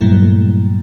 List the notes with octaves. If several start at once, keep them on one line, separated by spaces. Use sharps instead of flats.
G2 A#2 F#3 G3 A3 E4